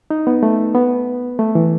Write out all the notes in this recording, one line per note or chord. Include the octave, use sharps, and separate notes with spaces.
D#4
B3
A3
B3
A3
E3